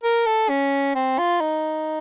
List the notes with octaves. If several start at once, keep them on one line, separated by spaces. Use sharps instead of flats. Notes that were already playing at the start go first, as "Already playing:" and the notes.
A#4
A4
C#4
C4
F4
D#4